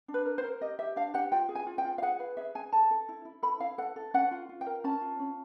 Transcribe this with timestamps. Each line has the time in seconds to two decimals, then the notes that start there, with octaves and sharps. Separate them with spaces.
0.08 D4
0.14 B4
0.26 A#4
0.38 C5
0.44 A#4
0.61 G4 D#5
0.79 G4 E5
0.96 D4 F5
1.14 G4 F#5
1.32 F4 G5
1.49 G#4
1.55 G#5
1.67 F4
1.78 G5
1.85 F4
1.98 F5
2.02 G#4 F#5
2.19 B4 F5
2.37 G#4 E5
2.55 G#4 G#5
2.72 A4 A5
2.91 A4
3.09 E4
3.25 E4
3.43 A4 B5
3.60 E4 F5
3.78 A4 F#5
3.96 A4
4.14 C#4 F#5
4.31 F4
4.49 F4
4.61 G5
4.67 A#4
4.84 C#4 A5
5.01 F4
5.20 C#4